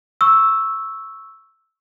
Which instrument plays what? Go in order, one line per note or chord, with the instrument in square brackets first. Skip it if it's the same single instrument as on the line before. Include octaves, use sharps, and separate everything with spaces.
[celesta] C#6 E6